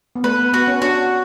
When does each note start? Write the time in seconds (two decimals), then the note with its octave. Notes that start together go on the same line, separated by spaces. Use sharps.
0.16 B3
0.24 A3 B4
0.39 B3
0.53 B3 F#4
0.67 C#4
0.82 D4 F#4